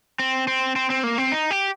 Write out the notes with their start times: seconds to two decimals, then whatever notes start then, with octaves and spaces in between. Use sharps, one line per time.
0.19 C4
0.48 C4
0.76 C4
0.90 C4
1.04 A#3
1.18 C4
1.32 D#4
1.51 G4